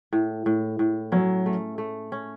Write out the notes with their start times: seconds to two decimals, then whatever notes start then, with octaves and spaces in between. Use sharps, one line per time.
0.13 A2
0.46 A2
0.79 A2
1.12 F#3 C#4
1.46 A3
1.78 A3
2.12 C#4